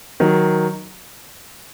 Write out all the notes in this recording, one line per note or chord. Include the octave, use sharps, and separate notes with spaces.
D#3 F#3